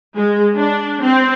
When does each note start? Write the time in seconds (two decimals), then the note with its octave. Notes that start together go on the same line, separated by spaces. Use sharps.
0.16 G#3
0.55 D4
1.01 C4